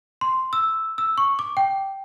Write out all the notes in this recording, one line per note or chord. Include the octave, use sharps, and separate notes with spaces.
C6
E6
E6
C#6
D6
G5